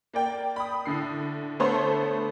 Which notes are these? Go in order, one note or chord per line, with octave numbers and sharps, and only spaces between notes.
A#3 D5 G5
B5 D#6
A2 D3 C7
D3 A3 B3 C5 C#5 C6